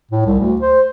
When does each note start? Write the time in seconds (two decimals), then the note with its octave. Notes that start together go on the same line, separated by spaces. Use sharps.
0.12 A2
0.26 C2
0.40 D2
0.62 C5